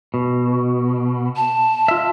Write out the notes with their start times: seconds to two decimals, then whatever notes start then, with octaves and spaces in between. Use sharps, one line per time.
0.14 B2
1.37 A5
1.88 F4 E5